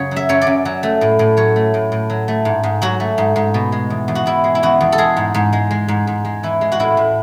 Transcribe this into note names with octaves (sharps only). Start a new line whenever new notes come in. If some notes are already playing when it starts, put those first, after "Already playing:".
Already playing: F#2 C#3 C#5
F#3
E5
F#2 C#5
D5
F#2
F#3
A3
A2
A2
F#3 C#5
A3
A2
A2
F#3
A3
G#2
G#2
F#3 F#4
A3
G#2
G#2
B2
G#3
E2
E2
F#4
B2 E4
G#3
E4
E2 F#4
E2
A4
G#3 G#4
G#2
G#2
G#3
G#3
G#2
G#2
G#3
E3 E4
G#3
F#4
A2 E4
A2